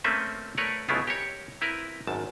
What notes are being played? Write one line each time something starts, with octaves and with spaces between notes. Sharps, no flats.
A3 A#3 C4 C#4 B4 E5
A3 A#4 B4 C#5 D5
B1 C#3 A3 B3 E4 F4
G4 A#4 C#5
C4 E4 A#4 B4
G#1 F#2 A5